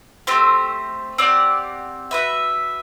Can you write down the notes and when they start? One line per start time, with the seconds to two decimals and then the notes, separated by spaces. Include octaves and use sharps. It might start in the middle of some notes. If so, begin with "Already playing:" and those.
0.27 A3 C4 G4 C5
1.18 C4 G4 D5 F#5
2.11 F#4 B4 E5